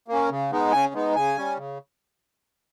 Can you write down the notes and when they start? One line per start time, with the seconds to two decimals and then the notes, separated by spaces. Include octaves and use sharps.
0.08 A#3 C#4
0.30 C#3
0.51 G#3 B3 D#4
0.72 C#3 G#5
0.94 G#3 B3 D#4
1.15 C#3 G#5
1.37 G3 C#4
1.57 C#3